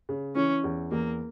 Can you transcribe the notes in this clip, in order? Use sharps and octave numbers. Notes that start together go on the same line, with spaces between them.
C#3
E3 C#4
E2
E2 A#3